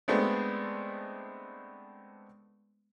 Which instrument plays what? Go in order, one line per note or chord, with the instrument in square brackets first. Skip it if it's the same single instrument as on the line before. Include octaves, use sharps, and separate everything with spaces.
[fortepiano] G#3 A3 B3 C4 D4